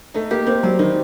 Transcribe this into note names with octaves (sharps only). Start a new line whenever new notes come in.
A3 D#4
A#3 G4
A#3 C4
F#3 G3
D#3 D#4